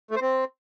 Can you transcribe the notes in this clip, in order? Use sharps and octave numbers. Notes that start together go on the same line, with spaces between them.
A3
C5
C4